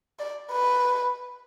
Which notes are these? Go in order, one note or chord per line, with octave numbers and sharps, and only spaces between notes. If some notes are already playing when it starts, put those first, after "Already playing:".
D5
B4